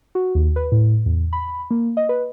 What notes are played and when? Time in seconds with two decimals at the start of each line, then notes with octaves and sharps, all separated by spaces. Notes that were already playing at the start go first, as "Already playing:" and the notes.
0.15 F#4
0.35 D#2
0.56 B4
0.72 A2
1.06 E2
1.33 B5
1.71 A#3
1.97 D#5
2.09 B4